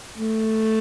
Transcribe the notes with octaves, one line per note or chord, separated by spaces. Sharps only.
A3